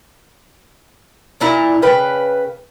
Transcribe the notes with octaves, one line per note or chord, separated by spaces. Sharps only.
A#2 D4 E4 A#5
C#3 B4 G5